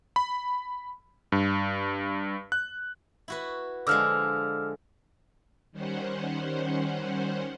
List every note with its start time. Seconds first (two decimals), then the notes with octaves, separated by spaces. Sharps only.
0.16 B5
1.32 G2
2.52 F#6
3.28 E4 F#4 B4
3.87 D3 F3 G#3 D6 E6 F6
5.72 D#3 G3 C#4 C5 F#5